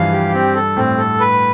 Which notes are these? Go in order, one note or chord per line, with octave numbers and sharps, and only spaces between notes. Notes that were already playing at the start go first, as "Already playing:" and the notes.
Already playing: G2 E3 F3 G3 F5
G4
C4
A4
A2 C4
A4
B4